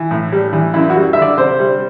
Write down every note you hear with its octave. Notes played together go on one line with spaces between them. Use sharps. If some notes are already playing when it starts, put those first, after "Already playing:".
Already playing: E3
A2
G3
E3
F#2 E4
F#4
G3
D3 E5
D5
C3 C5
G3